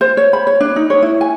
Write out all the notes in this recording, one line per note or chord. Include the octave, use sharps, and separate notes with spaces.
C5
C#5
B5
C#5
D4
D#4
C#5
E4
G#5